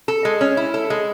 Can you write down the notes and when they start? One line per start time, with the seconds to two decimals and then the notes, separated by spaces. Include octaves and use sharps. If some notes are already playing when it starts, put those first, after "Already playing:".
0.08 A4
0.25 G#3
0.41 C#4
0.57 E4
0.74 A4
0.90 G#3